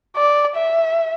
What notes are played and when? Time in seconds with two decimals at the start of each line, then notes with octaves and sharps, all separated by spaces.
0.16 D5
0.56 E5